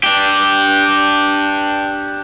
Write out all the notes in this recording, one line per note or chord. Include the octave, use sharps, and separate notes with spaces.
D4 G4